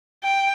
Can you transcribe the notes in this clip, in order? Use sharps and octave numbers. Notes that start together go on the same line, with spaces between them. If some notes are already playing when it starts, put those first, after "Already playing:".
G5